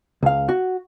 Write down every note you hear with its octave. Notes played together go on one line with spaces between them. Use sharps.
C#2 F5
F#4